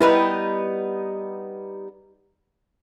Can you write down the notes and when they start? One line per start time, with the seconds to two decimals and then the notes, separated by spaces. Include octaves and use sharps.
0.01 G3 B3 D#4 E4 B4